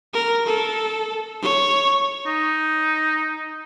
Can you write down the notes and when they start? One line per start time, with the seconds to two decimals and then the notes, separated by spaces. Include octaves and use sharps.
0.13 A#4
0.46 A4
1.42 C#5
2.26 D#4